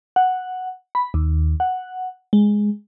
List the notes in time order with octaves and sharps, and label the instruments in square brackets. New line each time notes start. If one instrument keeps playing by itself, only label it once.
[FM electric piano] F#5
B5
D#2
F#5
G#3